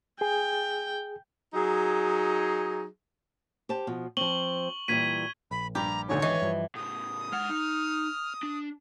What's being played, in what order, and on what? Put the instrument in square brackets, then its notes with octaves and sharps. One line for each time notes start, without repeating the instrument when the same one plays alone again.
[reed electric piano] G#4 G#5 [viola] G5
[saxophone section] F#3 D#4 G#4
[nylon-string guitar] G4 C5 A5
B2 F3
[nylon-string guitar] F3 C4 [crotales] C#6 F#7 G7
[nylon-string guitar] A#2 E3 G3 [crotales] G#6 B6 D#7
[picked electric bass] A#1 [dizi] B5
[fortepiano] G2 [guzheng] G4 [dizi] A#5
[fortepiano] D2 G#2 [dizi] C#5
[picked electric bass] G#1 [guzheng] E3 [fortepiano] D#5 C#6
[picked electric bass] G2 F3
[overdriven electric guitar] A2 C#3 [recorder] D#6
[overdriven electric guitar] G#3 F#5 [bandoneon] F6
[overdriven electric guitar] D#4
D4